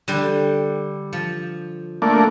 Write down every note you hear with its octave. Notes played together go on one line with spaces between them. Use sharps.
D3 G3 G5
F3
A3 A#3 D4